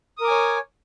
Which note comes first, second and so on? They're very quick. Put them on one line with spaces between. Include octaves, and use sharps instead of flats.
D#6 A#4 D6 G#5 C#5